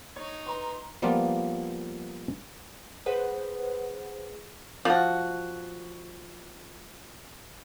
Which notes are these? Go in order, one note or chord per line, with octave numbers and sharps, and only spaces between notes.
D#4 C#5
B4 A#5 C6
F3 G3 A#3 B3 F4
G#4 B4 C5 F#5
F3 F#4